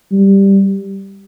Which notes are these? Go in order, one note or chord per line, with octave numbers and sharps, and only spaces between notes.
G3